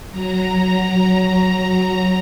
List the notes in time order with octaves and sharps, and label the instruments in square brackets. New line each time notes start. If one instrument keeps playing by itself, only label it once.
[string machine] F#3 A#5